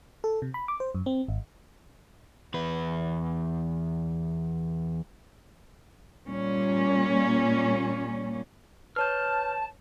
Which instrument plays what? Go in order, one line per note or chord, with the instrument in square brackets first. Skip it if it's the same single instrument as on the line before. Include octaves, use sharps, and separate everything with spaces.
[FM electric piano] A4
C3
B5
D6
C5
F#2
C4
G#1
[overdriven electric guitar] E2 B4
[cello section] A#2 G3 A#3 C#4
[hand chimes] B4 C#5 G6 [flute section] A5 [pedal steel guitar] F6